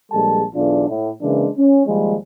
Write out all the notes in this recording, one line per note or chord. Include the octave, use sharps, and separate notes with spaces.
A#1 G3 G#3 A4 A5
B1 E2 D4 F4 D5
A2
C#3 E3 G#3 A#3 D4
C#4
D#2 F3 G3 G#3